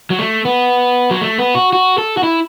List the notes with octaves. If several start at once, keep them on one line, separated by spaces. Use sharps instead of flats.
F#3
A3
B3
F#3
A3
B3
F#4
F#4
A4
F#4
E4